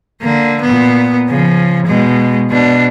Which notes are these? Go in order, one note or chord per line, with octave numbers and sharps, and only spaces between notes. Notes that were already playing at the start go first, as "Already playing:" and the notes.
D3 A#3
A#2 B3
C#3 F3
B2 G#3
B2 D4